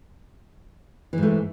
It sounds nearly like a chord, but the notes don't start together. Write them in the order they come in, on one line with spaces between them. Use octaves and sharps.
E3 G#2 A3